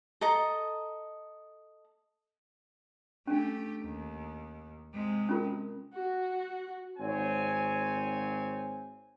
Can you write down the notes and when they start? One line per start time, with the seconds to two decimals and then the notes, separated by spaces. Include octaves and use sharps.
0.21 A4 D#5 A#5
3.27 A3 C#4 D4 G4
3.83 D#2
4.94 C3 G#3
5.29 C#4 F4 A#4
5.94 F#4
6.98 G#1 C4 C#5 G#5